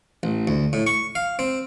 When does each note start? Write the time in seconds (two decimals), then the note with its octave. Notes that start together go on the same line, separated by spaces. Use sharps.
0.23 A1
0.47 D2
0.73 A2
0.87 C#6
1.15 F5
1.39 C4